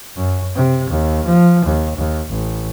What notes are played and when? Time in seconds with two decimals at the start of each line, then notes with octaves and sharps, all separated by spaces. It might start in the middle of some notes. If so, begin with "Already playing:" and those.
0.16 F#2
0.55 C3
0.90 D#2
1.26 F3
1.65 D#2
1.97 D#2
2.30 A1